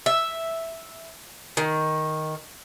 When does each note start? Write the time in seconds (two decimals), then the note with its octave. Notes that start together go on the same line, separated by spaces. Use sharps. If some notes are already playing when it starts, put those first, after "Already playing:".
0.06 E5
1.57 D#3